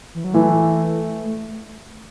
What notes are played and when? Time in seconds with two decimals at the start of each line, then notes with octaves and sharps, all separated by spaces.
0.15 E3
0.24 F#3
0.34 E3 A3